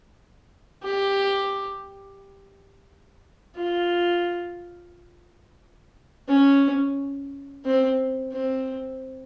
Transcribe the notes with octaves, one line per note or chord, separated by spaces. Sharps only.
G4
F4
C#4
C4
C4